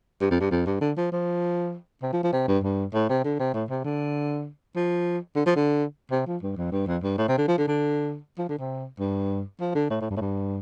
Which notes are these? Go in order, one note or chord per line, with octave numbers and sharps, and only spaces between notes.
G2
F2
G2
F2
G2
D3
F3
F3
C3
F3
F3
C3
G2
G2
A2
C3
D3
C3
A2
C3
D3
F3
D3
F3
D3
C3
F3
G2
F2
G2
F2
G2
A2
C3
D3
F3
D3
D3
F3
D3
C3
G2
F3
D3
A2
A2
G2
A2
G2